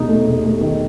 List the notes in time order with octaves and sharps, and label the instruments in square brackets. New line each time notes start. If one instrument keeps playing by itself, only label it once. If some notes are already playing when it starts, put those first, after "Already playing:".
Already playing: [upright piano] E1 D#2 [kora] D#4
[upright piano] A3
E1
A3
D#3